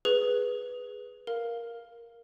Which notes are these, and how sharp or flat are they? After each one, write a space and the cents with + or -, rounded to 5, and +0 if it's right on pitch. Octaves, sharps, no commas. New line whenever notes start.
G#4 +0 B4 +0
A#4 +0 F5 +0